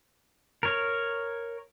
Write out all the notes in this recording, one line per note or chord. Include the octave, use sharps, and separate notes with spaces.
A#4 C#5